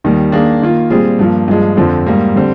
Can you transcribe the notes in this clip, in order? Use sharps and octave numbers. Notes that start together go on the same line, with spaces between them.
D#2 D#3 G3
D#3 A#3 D4 G#4
D#3 A#3 F4
A#2 G3 C4 F4 G#4
G2 F3 A#3
G2 F3 G#3
F2 D3 F3 C4
G#2 G3 A#3
D3 G3 C4